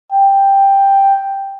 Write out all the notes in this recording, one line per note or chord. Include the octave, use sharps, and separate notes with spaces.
G5